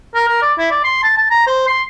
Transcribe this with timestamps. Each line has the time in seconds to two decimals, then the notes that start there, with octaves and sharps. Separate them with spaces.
0.14 A#4
0.28 A#4
0.42 D5
0.58 E4
0.71 D5
0.84 C6
1.03 A5
1.17 A5
1.30 A#5
1.47 C5
1.67 C6